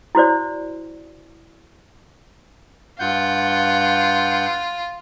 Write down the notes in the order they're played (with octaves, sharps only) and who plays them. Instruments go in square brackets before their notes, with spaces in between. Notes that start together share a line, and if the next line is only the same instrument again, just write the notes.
[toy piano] E4 F#4 C5 D5
[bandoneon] G2 F#5 G6 [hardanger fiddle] F4